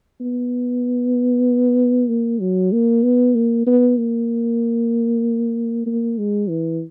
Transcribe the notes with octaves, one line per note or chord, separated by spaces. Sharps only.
B3
A#3
F#3
A#3
B3
A#3
B3
A#3
A#3
G#3
E3